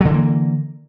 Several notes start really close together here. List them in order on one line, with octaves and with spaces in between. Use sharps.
F#3 D3 E3 A#3